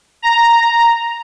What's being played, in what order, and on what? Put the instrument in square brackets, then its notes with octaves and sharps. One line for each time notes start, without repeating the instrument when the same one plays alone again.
[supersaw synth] A#5